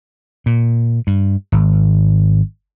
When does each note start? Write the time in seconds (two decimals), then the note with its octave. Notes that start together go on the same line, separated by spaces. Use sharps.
0.46 A#2
1.07 G2
1.52 G#1